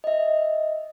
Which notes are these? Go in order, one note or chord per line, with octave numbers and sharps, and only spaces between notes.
D#5 E5